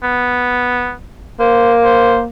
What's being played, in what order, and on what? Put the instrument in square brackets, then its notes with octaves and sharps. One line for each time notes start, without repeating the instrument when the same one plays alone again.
[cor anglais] B3
[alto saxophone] A#3 [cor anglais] C5
[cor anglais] C5